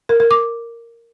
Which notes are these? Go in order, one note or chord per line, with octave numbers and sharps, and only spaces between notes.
A#4
A#4
D6